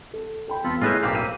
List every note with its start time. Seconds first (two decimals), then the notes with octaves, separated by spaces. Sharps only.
0.14 A4
0.48 A4 G5 B5
0.64 E2 F4 A4 B5
0.82 A2 C#4 F4 G#4 B4 D#5 E5 G6
1.03 B1 A#3 C4 F5 B5 D6 E6
1.15 D#7